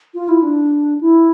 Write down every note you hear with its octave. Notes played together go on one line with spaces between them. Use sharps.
F4
E4
D4
E4